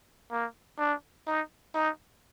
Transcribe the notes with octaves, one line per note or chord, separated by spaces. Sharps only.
A#3
D4
D#4
D#4